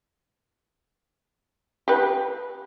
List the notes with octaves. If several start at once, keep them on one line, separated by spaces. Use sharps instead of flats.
G4 B4